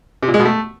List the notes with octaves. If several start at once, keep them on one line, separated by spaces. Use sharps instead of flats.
C3
A#2
G#3
B2
A3